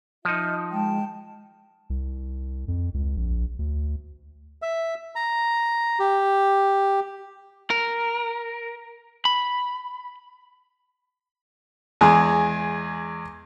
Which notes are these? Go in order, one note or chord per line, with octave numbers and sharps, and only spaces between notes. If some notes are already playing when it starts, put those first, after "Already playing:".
F3 D#4 F4 D#5 E5
G#3 G5 A5
C2
F2
C#2
A#1
D2
E5
A#5
G4
A#4
B5
E2 G#3 G#4